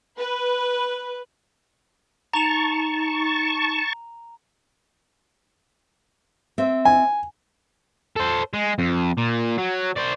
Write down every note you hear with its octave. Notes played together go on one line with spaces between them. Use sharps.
B4
D#4 A5 A#5 C#6 F7
C4 E5
G#5
A4 C5
G#3
F2
A#2
F#3
C5 D5